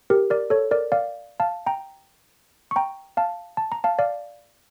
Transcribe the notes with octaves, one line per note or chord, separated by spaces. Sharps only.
G4 A#4
A#4 D5
A4 C#5
A#4 D5
D5 F5
F5 A5
G5 A#5
C#6
G5 A#5
F5 A5
A5
A#5
F5 A5
D5 F5